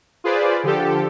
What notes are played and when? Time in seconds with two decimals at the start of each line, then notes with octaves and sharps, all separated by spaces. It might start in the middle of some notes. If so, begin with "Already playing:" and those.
0.24 F4 G#4 B4 C5 D5
0.63 D3 F3 G4 A4